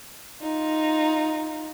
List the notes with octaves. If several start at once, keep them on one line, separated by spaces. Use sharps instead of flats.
D#4 F4